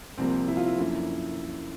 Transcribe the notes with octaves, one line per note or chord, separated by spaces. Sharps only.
C2 C3 F3 A#3 C4
E4
F4
E4
F#2 D3 F3 A#3